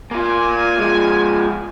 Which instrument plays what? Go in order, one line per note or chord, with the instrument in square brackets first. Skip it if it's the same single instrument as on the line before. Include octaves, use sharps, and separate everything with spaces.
[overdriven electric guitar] A#3 F4 [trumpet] G#5
[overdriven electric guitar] F3 G#3